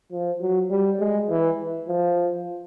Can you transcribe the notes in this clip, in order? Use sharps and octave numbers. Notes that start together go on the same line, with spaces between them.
F3
F#3
G3
G#3
E3
F3